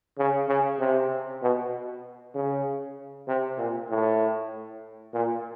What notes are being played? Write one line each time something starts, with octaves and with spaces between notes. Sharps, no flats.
C#3
C#3
C3
B2
C#3
C3
A#2
A2
A#2